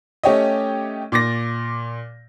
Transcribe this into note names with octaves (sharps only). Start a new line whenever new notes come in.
A3 C#4 G4 C#5 D#5
A#2 D6 A6 A#6